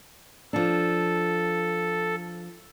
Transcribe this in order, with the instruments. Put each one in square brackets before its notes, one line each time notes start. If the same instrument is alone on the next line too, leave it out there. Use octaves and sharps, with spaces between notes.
[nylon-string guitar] F3 D4 [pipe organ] A4